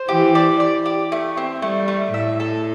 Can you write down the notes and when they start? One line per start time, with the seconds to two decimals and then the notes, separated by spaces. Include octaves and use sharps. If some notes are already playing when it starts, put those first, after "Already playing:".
Already playing: C5
0.09 E3 G4
0.35 D5
0.60 D5
0.86 G4
1.12 A3
1.37 C4
1.62 G3 A3
1.88 A3
2.13 A2 E5
2.40 A4